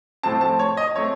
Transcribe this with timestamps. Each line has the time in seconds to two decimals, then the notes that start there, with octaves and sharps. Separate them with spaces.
0.23 A2 F3 C4 A5
0.41 A5
0.59 C#5
0.77 D#5
0.96 F3 A3 C4 C#5